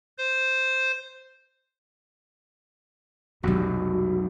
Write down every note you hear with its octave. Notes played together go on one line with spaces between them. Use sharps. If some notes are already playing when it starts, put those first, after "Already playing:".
C5
B1 F2 C3 G3 F#4